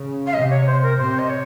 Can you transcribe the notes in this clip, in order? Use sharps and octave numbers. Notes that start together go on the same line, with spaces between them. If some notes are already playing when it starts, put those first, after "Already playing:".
Already playing: C#3
F5
C3 D#5
C#5
C5
A#4
C3 C5
D#5
C#5